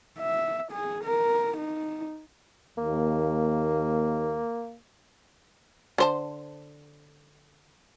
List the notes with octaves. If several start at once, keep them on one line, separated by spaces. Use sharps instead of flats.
E5
G#4
A#4
D#4
D#2 A#3
D3 C5 A5